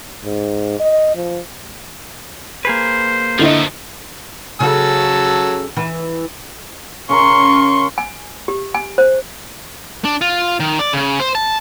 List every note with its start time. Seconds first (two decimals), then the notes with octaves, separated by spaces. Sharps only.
0.24 G#2
0.79 D#5
1.15 F3
2.65 A#3 G#4 B4 C5
3.39 D3 F3 A3 E4 D#5
4.60 C#3 F#3 A4 A5 E6
5.77 E3
7.09 C#3 C#4 A#4 C6 C#6
7.98 G#5
8.48 G4
8.74 G#5
8.98 C5
10.05 D4
10.21 F4
10.60 D#3
10.79 D5
10.93 C#3
11.20 C5
11.35 A5